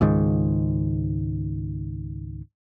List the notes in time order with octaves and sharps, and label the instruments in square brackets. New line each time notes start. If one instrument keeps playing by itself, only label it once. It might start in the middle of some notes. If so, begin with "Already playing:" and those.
[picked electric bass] C#2 G#2 D#3